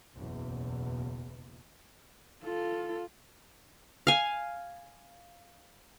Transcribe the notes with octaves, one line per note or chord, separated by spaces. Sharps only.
F#1 B1 E2 B2
F4 A4
F5 G#5